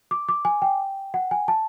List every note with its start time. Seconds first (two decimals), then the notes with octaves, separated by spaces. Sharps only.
0.11 D6
0.29 D6
0.45 G#5
0.62 G5
1.14 F#5
1.31 G#5
1.48 A5